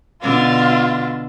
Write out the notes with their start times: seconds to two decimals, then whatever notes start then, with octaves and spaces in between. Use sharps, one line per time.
0.22 B2 D3 D4 F4